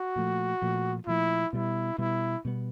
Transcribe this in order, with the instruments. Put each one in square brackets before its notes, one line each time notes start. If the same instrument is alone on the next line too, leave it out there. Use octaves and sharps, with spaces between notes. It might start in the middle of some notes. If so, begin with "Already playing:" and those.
Already playing: [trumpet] F#4
[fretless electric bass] A#2 F3 A3
A#2 F3 A3
[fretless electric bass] A#2 F3 A3 [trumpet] E4
[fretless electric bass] B2 G3 B3 [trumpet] E4
[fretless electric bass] B2 G3 B3 [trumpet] E4
[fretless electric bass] B2 G3 B3